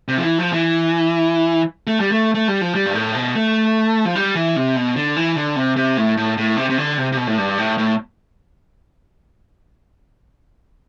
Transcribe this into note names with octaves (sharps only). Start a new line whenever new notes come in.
C3
F3
E3
F3
E3
A3
G3
A3
A3
G3
F3
G3
G2
A2
B2
A3
F3
G3
E3
C3
B2
D3
E3
D3
C3
C3
A2
A2
A2
C3
C3
D3
C3
C3
B2
A2
G2
A2
A2